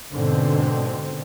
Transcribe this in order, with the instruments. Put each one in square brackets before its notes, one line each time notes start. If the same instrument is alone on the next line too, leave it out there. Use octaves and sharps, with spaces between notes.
[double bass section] G#2 B2 D3 C4